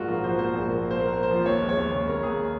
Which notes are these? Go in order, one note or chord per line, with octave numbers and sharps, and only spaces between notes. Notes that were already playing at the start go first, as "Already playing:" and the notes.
Already playing: A#1 G#2 A#3 F4 F#4
F3 A#4
F3 C5
A#3 C5
A#1
A#3
A#3
C5
A#3 A#4
A#3
C5
F3
D#2 C#5
G#3
C#5
D#2
C#3 C#5
D#2 A#4
D#2 G#4